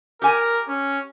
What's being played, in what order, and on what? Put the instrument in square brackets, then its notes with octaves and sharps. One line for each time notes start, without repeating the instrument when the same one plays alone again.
[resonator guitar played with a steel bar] G4 G#5 [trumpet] A#4
[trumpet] C#4